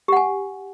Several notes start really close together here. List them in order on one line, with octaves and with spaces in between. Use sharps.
G4 F#5 G#5